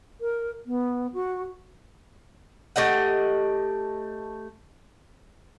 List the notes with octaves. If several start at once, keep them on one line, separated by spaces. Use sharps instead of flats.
A#4
B3
F#4
A3 G4 D#5 F#5